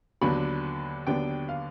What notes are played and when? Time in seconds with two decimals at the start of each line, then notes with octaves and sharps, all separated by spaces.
0.21 D#2 D3 F#3 B3 D4 B5
1.07 D#2 D3 F#3 B3 D4 G5
1.49 F5